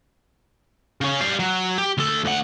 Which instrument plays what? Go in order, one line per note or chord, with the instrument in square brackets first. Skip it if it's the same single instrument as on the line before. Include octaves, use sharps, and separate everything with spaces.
[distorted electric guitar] C#3 C#4
G3 F5
F#3
G4
D2 A4
D2 F#5